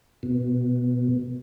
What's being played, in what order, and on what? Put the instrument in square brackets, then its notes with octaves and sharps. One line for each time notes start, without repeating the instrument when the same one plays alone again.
[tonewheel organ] B2